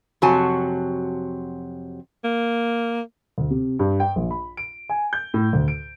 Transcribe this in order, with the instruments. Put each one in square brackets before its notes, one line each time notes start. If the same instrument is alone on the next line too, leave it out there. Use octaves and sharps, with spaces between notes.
[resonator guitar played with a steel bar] F2 C3 F#3 F#4 G#5 A5
[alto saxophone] A#3
[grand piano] D2
C3
G2
G5
A#1
B5
D7
G#5
G6
A2
D2
D7